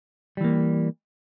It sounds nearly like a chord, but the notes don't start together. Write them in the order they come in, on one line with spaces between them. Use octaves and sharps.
G3 E3 A#3